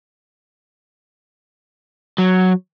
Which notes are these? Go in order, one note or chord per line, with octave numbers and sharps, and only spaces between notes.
F#3